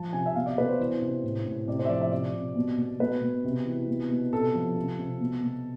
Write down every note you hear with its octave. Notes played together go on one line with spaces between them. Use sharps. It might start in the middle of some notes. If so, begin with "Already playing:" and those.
Already playing: F3 A5
C3 G#5
E5
B2 F5
D5
B2 B4
C5
E3
C3
A2
A2
C3 D5
C5
E5
F3 D5
E5
C3 D5
C3
B2
B2
B2 B4
B2
C3
E3
B2
B2
C3 A4
F3
C3
C3
B2
B2